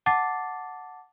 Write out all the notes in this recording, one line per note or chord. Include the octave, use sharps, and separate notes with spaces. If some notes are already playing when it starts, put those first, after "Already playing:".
F#5 A5 D6 A6 C7